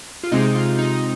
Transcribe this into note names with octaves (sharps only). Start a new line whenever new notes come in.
F4
C3 G#3 C4 D#4
F4
D#4
D#4